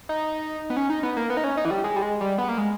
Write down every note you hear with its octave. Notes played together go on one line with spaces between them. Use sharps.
D#4
B3
C#4
D#4
B3
A#3
B3
D#4
C#4
D#4
E3
G3
G#3
G3
G#3
G3
B3
A#3
G#3